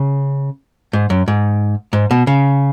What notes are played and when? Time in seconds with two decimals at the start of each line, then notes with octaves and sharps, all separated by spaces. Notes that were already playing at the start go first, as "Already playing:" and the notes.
Already playing: C#3
0.93 G#2
1.10 F#2
1.28 G#2
1.93 G#2
2.11 B2
2.27 C#3